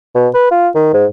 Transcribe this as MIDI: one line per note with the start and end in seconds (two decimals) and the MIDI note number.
0.15 0.28 47
0.34 0.48 71
0.51 0.68 65
0.75 0.93 51
0.94 1.06 44